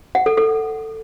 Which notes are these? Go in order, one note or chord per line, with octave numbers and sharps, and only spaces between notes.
F#5
A4
A4